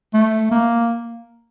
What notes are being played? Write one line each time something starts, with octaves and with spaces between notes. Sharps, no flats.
A3
A#3